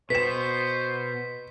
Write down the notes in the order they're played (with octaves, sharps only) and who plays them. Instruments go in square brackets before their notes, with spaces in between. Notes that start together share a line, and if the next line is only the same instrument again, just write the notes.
[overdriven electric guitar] B2 [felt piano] B4 E7 [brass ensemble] C5 [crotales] B6